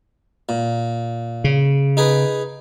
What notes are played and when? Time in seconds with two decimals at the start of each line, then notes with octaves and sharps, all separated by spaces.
0.49 A#2
1.44 C#3
1.97 D#4 G#4 B4